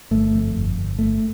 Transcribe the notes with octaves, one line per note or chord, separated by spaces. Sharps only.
G1 A3
F2
G1
G1
G1 A3